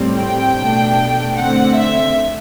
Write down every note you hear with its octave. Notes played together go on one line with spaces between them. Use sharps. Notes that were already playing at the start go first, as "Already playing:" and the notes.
Already playing: A2 G3 C4
G5
B2 A3 D4
D3 A3 C4 F#5
E5